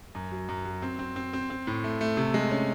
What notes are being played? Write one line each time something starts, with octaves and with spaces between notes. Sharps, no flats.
F#2
F#3
F#2
F#3
C4
C4
C4
C4
C4
A2
A3
A3
C3
G#3
C#4